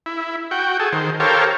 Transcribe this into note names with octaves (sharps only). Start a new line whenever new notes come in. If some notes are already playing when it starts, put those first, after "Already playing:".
E4
F#4 G5
G#4 A4
D#3 C5
G4 A4 A#4 C5 C#5 F5